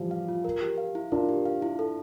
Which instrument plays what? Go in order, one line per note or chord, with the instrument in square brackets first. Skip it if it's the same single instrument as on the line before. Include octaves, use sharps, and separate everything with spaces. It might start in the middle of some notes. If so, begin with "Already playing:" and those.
Already playing: [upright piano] E3 F3 G3
[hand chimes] F5
F4
A#4
G4
F5
E4
[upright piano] D4 F4 [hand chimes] A#4
[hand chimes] G4
F5
E4
A4